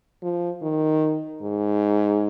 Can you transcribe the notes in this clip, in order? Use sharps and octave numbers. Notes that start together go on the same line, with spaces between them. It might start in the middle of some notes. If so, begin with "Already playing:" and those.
F3
D#3
G#2